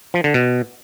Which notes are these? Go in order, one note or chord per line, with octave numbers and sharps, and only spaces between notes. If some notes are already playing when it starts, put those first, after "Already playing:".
F3
D3
B2